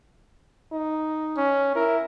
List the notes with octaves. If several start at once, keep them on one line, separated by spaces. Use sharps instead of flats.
D#4
C#4
E4 A#4